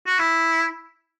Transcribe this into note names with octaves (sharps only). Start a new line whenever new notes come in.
F#4
E4